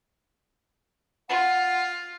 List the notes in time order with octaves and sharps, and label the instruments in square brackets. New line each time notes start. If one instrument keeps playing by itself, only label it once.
[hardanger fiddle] F4 [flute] F#5